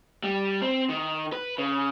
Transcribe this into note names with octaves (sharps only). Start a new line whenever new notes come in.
G3
C4
D#3
B4
C#3